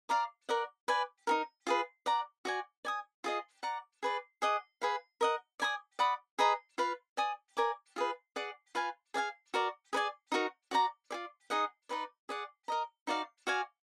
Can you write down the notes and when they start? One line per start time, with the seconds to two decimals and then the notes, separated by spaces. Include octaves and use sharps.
0.09 D5 F5 A#5 D6
0.49 A#4 D5 F#5
0.88 B4 D5 G#5
1.27 D#4 F#4 A#4
1.67 F4 G#4 B4
2.06 D5 F#5 A#5
2.45 F#4 D5 G#5
2.85 D5 G#5 D#6
3.24 F4 G#4 D#5
3.63 D5 F#5 A#5 D6
4.03 G#4 B4 D5
4.42 G#4 D#5 F#5 D6
4.82 G#4 B4 F5
5.21 A#4 D#5 F#5
5.60 D5 G#5 B5 D#6
5.99 D5 F#5 B5 D#6
6.39 G#4 B4 D#5 A#5
6.78 F4 B4 F5 B5
7.17 D5 G#5 D#6
7.57 A#4 D5 G#5 D6
7.96 F4 G#4 B4
8.36 G#4 D5 F#5 D6
8.75 F4 B4 F5 G#5
9.14 G#4 D5 F5 G#5
9.54 F#4 A#4 D5
9.93 G#4 B4 D5 G#5
10.32 D#4 F#4 A#4
10.71 F#4 D5 F#5 A#5
11.11 F4 G#4 D5
11.50 D#4 G#4 D#5 F#5
11.89 D#4 F#4 B4 D5
12.29 G#4 D5 F#5
12.68 A#4 D#5 A#5
13.07 D#4 F#4 D5 F5
13.47 F#4 D5 F5 G#5